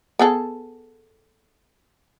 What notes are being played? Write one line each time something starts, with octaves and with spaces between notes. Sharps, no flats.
B3 G#4 A4